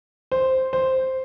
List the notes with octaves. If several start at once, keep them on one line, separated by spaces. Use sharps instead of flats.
C5
C5